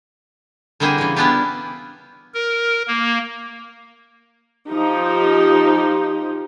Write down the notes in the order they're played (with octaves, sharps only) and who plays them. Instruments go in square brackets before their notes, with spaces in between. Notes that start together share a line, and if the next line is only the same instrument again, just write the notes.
[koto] D3 G3 A#3 C4 E4 G#4
C#3 E3
G3 B3 D4 E4 F4 G4
[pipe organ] A#4
A#3
[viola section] F3 D#4 G4